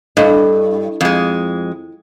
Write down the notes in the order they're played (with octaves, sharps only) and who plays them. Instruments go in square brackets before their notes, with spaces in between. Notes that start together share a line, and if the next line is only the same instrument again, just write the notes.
[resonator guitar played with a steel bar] G2 [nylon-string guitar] E4 A4 D#5
[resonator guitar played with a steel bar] F2 G#3